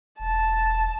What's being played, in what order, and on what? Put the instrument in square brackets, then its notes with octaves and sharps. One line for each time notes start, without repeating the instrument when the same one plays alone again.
[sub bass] E1 [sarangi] A5